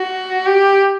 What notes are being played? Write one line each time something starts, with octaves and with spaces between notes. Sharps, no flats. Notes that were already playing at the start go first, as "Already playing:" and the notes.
Already playing: F#4
G4